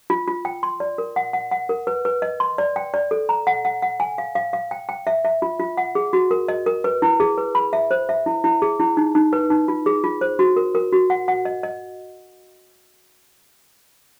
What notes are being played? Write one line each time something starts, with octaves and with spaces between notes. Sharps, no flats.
F4
F4
G5
C6
D5
A#4
F#5
F#5
F#5
A#4
B4
B4
D#5
C6
D5
G5
D5
A4
A#5
F#5
F#5
F#5
G#5
F5
F5
F5
G5
G5
E5
E5
F4
F4
F#5
G#4
F#4
A#4
D#5
A#4
B4
E4
G#4
B4
B5
E5
C5
E5
E4
E4
G#4
E4
D#4
D#4
B4
D#4
F4
G#4
F4
C5
F#4
A#4
A#4
F#4
F#5
F#5
D#5
D#5